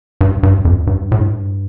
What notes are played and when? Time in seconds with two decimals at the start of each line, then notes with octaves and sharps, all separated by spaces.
0.21 G2
0.43 G2
0.65 F2
0.87 G2
1.12 A2
1.20 G2